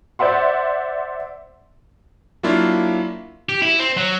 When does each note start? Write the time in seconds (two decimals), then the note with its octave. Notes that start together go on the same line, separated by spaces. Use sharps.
0.19 C5 D5 E5 F#5 C6
2.43 F#3 A#3 D4 E4 F4 F5
3.49 G4
3.62 E4
3.79 C4
3.97 F#3